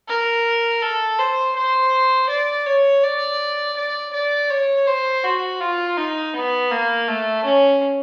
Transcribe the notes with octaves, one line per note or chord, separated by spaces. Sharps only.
A#4
A4
C5
C5
D5
C#5
D5
D5
D5
C#5
C5
F#4
F4
D#4
B3
A#3
A3
C#4